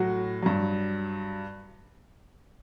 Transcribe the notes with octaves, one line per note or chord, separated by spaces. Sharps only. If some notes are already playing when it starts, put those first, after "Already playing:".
Already playing: A2 F#3 F#4
G2 F#3